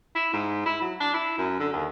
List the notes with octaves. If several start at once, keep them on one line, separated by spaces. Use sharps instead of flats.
E4
G#2
E4
F#3
D4
E4
F#2
D3
D#2